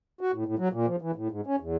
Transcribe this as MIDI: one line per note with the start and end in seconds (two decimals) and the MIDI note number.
0.21 0.32 66
0.32 0.44 45
0.46 0.55 45
0.59 0.68 54
0.73 0.86 46
0.87 0.96 53
1.02 1.11 52
1.16 1.28 45
1.31 1.41 44
1.47 1.56 61
1.60 1.76 40